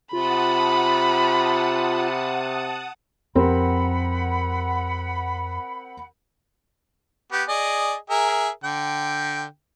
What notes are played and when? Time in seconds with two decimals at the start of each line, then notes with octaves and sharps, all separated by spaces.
0.13 C3 F4 F#5 A5 B5 D#6
3.35 F2 C4 G4 A#4 F#5 B5
7.32 B3 G4
7.48 G#4 D5 D#5
8.10 G#4 A#4 E5
8.64 D3 G5